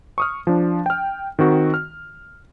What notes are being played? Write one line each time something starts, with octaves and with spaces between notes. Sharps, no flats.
C#6 D#6 F6
F3 D4
G5 F6
D#3 C4 F#4
F6